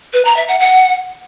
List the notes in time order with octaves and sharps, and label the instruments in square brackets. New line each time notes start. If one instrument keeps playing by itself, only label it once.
[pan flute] B4
A#5
E5
F#5
F#5